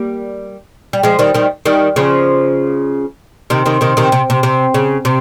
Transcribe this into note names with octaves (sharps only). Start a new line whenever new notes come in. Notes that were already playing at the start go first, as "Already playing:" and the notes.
Already playing: G3 A#3
G3
F3 G#3
D#3 G3
D#3 G3
D#3 G3
C#3 F3
C3 D#3
C3 D#3
C3 D#3
C3 D#3
C3
C3
C3
C#3
C3